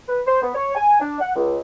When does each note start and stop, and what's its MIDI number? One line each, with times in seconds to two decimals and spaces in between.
0.08 0.20 71
0.27 0.40 72
0.42 0.52 59
0.54 0.71 73
0.75 0.97 80
1.00 1.19 62
1.20 1.30 78
1.35 1.59 37